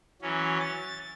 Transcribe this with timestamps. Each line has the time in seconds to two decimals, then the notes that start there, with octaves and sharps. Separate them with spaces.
0.22 E3 F#3 C#4
0.60 A6